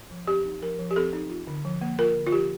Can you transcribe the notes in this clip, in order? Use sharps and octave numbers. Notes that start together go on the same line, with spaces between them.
F3
C4 G4
D#4
F3 A#4
F3
G4
C4 A4
D#4
F4
D3
F3
A#3
F4 A#4
D3
F4
F3 G4